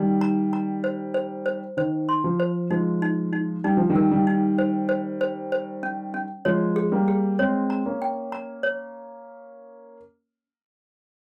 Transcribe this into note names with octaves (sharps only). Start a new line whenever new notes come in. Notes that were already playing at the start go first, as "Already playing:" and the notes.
Already playing: D#3 G3 D#4
A#5
A#5
C5
C5
C5
D#3 C5
C6
F3
C5
F3 G#3 D#4
D#4
D#4
G3 D#4
F3
D#3 G3
A#4
D#3 G3
D#4
C5
C5
C5
C5
C#4
C#4
F3 G#3 C#5
G#4
G3 A#3
G#4
G#3 C4 C#5
A#5
A#3 C#4
G5
A#5
C#5